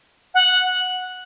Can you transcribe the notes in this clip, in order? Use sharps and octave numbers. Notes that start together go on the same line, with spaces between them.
F#5